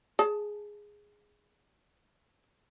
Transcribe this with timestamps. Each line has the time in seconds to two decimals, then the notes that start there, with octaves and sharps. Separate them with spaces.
0.19 G#4 A5